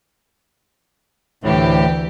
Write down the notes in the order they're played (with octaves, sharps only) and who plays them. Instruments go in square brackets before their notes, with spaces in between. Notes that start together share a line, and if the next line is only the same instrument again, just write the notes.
[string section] D2 E3 G4 [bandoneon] A2